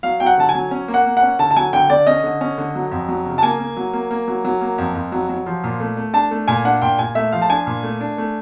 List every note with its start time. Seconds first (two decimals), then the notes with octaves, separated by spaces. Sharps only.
0.03 F#3 F5
0.20 F#3 G5
0.26 F#5
0.38 D3 A5
0.49 G#5
0.54 F#3
0.71 C#4
0.88 A#3
0.94 F#5
1.06 A#3
1.17 F#5
1.22 C#4
1.39 D3 A5
1.51 A5
1.56 F#3 G#5
1.73 D3 G5
1.90 D3 D5
2.07 C#4 D#5
2.24 D3
2.41 C#4
2.58 D3
2.75 F#3
2.91 F2
3.09 F#3
3.26 C#3
3.38 A5
3.43 A#3 G#5
3.59 A#3
3.77 F#3
3.93 A#3
4.11 A#3
4.28 F#3
4.45 F#3
4.61 A#3
4.78 F2
4.95 F2
5.12 F#3
5.29 F#3
5.46 F3
5.64 A#2
5.80 A3
5.97 A3
6.13 D4 A5
6.31 A3
6.48 A#2 G#5
6.65 D4 F#5
6.82 A#2 G5
6.99 A#2 G#5
7.15 A3 E5
7.32 F3 F5
7.42 A5
7.50 D4 G#5
7.67 A#2
7.83 A3
8.00 D4
8.18 A3